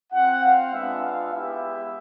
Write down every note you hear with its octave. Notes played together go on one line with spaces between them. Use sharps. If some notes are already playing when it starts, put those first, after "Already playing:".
C4 F4 F#5
F5
G#3 B3 D4 F4 E5
F5
G#3 B3 E4 G4 E5